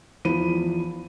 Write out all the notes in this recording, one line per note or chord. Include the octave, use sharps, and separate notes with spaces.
E2 E3 F3 C5 B5 D#7